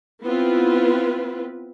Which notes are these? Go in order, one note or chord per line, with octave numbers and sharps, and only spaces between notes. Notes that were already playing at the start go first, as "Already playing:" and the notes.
B3 C4 E4 F4 B4